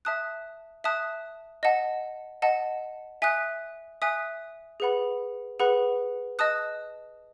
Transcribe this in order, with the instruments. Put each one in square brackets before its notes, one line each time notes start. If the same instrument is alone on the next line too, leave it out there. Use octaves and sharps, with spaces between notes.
[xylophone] E5 A5 D#6 F#6
E5 A5 D#6 F#6
D#5 F#5 A5
D#5 F#5 A5
E5 G#5 D#6 F#6
E5 G#5 D#6 F#6
G#4 B4 F#5 B5
G#4 B4 F#5 B5
D#5 A5 D#6 F#6